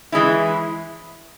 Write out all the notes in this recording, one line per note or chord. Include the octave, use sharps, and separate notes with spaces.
E3 G#3 C#4 E4